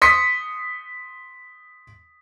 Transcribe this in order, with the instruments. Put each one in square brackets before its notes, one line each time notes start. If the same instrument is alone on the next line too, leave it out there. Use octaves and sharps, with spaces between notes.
[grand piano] C6 D#6 B6 C#7